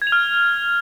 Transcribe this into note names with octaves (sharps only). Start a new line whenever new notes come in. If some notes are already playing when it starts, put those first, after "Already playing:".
G#6
F7
F6